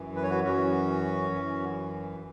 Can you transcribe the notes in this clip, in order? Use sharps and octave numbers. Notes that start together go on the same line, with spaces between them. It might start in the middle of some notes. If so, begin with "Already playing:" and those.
Already playing: F#2 E3
B4
C#5
F#4 B4
F#2 E3 C#4 F#4
F#2 E3